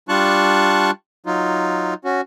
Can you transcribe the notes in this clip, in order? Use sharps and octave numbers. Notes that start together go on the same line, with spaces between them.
G3 D4 F4 A5 C#6 F#6
F#3 D#4 F4
C#4 F#4